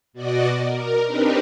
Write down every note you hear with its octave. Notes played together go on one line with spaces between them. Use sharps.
B2 F#4 D5 D#5 D6
A#4
C4 D4 D#4 G4 A#4 B4